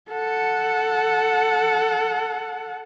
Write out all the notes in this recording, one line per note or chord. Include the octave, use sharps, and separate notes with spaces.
A4 F#5